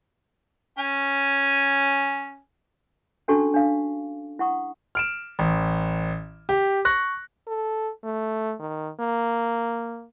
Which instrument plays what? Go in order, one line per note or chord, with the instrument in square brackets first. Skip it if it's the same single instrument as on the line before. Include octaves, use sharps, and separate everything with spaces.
[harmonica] C#4 G#5
[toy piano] C#4 D4 F#4 A4 A5 C#6
D4 F5
E4 F#5 C#6 D#6
[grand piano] F6 D7 E7
A1
G4
C#6 F#6 A#6
[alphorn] A4
A3
D#3
A#3